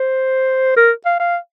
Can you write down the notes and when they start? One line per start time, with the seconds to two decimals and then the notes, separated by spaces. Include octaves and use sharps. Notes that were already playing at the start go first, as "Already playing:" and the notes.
Already playing: C5
0.76 A#4
1.05 F5
1.20 F5